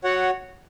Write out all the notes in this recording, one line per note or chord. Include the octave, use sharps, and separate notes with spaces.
F#4 C#5 F#5